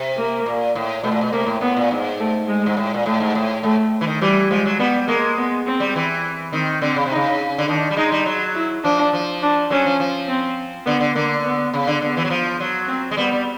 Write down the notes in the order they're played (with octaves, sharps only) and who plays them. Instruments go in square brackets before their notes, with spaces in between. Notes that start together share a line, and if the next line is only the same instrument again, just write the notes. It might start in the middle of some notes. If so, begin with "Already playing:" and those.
Already playing: [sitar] C3
[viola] A#3
[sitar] A#2
A2
[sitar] B2 [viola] A3
[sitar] A#2
B2
[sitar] C3 [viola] A#3
[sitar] A2
[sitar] A2 [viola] B3
[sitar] A#2
G#2
[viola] A3
G#3
[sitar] G#2
A2
A#2
[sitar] A2 [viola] A3
[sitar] G#2
A2
[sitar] A2 [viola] A3
[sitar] E3
D#3
[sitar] E3 [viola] G3
[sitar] F3 [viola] G#3
[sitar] F#3
[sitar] G3 [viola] B3
[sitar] G#3 [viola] A#3
[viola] B3
C4
[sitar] G3
E3
[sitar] D#3 [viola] C4
[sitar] D3 [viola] C4
[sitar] C#3
C3
[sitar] C#3 [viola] D#4
[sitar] D3
[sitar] D#3 [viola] D4
[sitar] G3
[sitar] G#3 [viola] D#4
[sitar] G3
F#3
[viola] E4
[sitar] F3 [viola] D4
[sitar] F3
[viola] D4
[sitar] F#3 [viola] C#4
[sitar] F3
F3
[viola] C4
[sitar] D3 [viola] B3
[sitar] D3
[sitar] D3 [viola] A#3
[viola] B3
[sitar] C#3
D3
[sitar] D3 [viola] B3
[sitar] E3
F#3
F3
F#3
[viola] C4
[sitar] G#3
[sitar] G3 [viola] B3
[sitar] G3